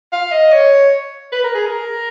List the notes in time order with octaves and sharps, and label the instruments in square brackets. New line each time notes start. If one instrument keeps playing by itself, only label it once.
[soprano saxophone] F5
D#5
C#5
B4
A#4
G#4
A#4